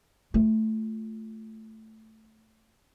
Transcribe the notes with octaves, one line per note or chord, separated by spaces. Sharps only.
A3 F4